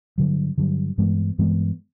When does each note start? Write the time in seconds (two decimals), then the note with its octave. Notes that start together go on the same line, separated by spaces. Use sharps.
0.18 G2 D3 F#3
0.58 G2 D3 F#3
0.98 G2 E3 G#3 B3
1.38 G2 E3 G#3 B3